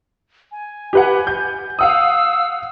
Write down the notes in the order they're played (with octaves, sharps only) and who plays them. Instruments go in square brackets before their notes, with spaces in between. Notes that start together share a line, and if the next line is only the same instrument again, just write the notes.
[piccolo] G#5
[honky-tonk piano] G4 B4 F#5
G6
[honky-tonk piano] F5 F#5 D#6 [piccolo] E6